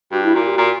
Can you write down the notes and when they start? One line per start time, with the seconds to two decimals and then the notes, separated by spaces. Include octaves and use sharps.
0.12 G2 F#4
0.24 E4
0.34 A#2 F#4
0.47 G4
0.58 A#2 F#4